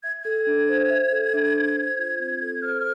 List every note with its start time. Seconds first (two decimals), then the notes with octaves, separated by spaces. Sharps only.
0.03 E5 G#6
0.22 A4 G#6
0.47 D4
0.69 C5
0.90 E5
1.12 A4
1.33 D4
1.54 C5
1.76 C5
1.98 F4
2.19 C4
2.41 A4
2.62 C5 F6